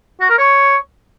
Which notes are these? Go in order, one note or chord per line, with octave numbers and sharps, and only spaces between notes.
F#4
A#4
C#5